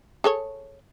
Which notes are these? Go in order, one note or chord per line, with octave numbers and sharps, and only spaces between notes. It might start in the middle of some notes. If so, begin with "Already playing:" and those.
G#4 A4 C#5